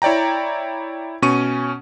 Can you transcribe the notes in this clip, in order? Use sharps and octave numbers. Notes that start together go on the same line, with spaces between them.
E4 C#5 D5 G5 A#5
B2 C#4 C#6 D#7